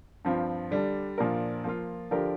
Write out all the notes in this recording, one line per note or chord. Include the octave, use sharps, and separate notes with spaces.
G2 F3 C4 F4
D3 G3 D4
A#2 F3 D4 A#4
F3 A#3 F4
D3 F3 D4 G4 A#4